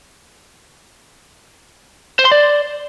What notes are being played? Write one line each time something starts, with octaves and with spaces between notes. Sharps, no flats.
C5
C6
D5